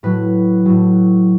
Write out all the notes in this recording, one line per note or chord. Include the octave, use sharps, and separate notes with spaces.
A2 F#3 B4
A2 F#3